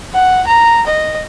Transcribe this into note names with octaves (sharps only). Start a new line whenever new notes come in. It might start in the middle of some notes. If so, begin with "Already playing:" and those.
F#5
A#5
D#5